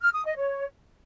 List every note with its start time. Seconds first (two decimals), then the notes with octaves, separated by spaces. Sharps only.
0.02 F6
0.13 D#6
0.25 D#5
0.37 C#5